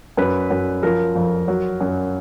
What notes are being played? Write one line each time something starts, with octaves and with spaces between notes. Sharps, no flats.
F#2 B4
F#2
F3 A#4
F2
F#3
F#2